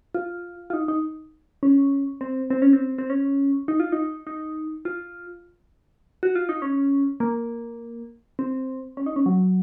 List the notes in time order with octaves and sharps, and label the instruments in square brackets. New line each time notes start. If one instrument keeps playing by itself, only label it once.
[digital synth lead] F4
F4
D#4
D#4
C#4
C4
C4
C#4
C4
C4
C#4
D#4
F4
D#4
D#4
F4
F#4
F4
D#4
C#4
A#3
C4
C#4
D#4
C#4
F#3